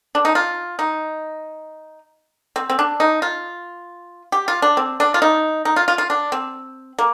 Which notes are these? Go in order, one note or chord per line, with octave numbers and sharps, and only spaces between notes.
D4
D#4
F4
D#4
C4
C4
D4
D#4
F4
G4
F4
D4
C4
D4
F4
D#4
D#4
F4
F4
F4
D4
C4
A#3